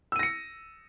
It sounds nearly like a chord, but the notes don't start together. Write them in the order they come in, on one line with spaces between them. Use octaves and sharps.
E6 D#7 A#6 C#7